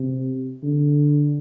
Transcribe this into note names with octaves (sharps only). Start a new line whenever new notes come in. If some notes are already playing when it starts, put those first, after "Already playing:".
Already playing: C3
D3